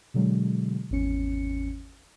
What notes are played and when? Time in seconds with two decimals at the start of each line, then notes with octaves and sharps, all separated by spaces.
0.14 B2 D3 F#3 G#3
0.91 G#1 E2 C#4 C#7